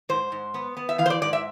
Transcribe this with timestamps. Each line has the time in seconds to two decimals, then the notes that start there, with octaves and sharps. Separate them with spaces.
0.09 G#2 C5
0.32 G#2
0.54 B3
0.77 B3
0.89 E5
0.98 E3 F5
1.06 C5
1.10 D5
1.22 G#2 D5
1.33 E5